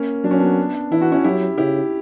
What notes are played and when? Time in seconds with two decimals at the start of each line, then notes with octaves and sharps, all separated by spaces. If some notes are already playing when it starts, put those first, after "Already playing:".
Already playing: A#3 C#4
0.24 F#3 D4
0.31 C#4
0.38 B3 D4
0.91 E3 E4
1.01 F#4
1.12 C#4 E4
1.24 F#3 E4 G4
1.58 C#3 E4 G4